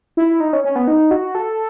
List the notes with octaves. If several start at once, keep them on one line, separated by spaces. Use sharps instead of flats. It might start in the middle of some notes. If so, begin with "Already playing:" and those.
E4
D#4
C#4
C#4
B3
D#4
F#4
A4